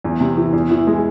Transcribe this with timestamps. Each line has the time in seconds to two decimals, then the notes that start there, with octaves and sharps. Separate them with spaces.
0.04 E2
0.20 C3
0.37 E3
0.53 E2
0.71 E3
0.87 G#3